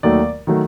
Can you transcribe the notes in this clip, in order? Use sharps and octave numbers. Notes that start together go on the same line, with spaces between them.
D#2 D#3 F#3 A3 D5
D#3 F#3 A3